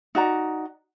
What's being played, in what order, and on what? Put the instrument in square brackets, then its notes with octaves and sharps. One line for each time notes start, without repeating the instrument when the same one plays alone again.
[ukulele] D#4 F#4 D5 A#5